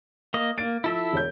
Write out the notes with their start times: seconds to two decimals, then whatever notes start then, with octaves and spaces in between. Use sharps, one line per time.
0.34 A#3 D#5
0.58 A#3 A6 D7
0.84 F3 E4 A4 E5
1.13 E1 C#5 G6